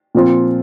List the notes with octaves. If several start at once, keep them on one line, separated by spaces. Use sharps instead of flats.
A#2 F3 C4 F4